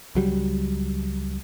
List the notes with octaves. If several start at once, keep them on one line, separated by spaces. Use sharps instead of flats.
C#2 F#3 G3